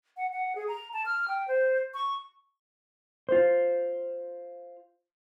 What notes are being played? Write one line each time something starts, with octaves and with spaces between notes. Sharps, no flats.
F#5
F#5
G#4
A#5
A5
F6
G5
C5
C#6
F4 C5